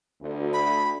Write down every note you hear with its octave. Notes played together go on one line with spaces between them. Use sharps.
D2
B5